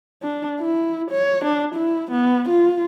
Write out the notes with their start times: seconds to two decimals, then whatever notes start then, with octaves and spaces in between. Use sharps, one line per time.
0.23 D4
0.60 E4
1.11 C#5
1.45 D4
1.75 E4
2.11 B3
2.49 F4